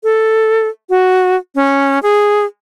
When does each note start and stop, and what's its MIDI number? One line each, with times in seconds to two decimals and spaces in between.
0.04 0.68 69
0.90 1.36 66
1.55 1.99 61
2.03 2.45 68